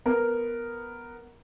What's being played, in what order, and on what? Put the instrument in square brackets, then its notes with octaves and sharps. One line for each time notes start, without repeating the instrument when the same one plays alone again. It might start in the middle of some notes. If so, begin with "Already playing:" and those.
[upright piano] B3 A#4